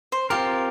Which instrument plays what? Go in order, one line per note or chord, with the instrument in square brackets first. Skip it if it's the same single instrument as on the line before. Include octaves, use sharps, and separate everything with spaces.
[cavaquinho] C5
[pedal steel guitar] C4 F4 A#4 [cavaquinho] G4